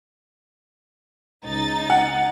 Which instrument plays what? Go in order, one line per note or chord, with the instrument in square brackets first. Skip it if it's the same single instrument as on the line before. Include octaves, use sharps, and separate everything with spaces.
[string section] C#2 D#4 A6
[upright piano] F#5